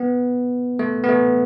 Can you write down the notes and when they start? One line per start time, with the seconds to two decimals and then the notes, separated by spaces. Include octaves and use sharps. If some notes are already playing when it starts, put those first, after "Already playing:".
Already playing: B3
0.79 A3
1.04 B3
1.09 A3